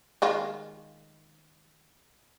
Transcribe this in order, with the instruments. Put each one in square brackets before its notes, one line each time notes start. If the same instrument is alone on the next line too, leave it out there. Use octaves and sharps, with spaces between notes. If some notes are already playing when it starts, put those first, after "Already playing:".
[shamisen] D#3 G#3 F4